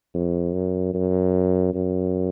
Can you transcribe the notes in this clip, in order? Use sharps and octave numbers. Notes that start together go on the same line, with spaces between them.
F2
F#2
F#2
F#2